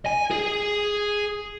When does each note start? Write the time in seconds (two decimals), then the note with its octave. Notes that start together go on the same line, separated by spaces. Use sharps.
0.06 G#5
0.31 G#4